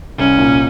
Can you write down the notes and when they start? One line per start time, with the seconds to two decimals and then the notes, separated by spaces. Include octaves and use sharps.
0.18 C2 C#4
0.38 A#2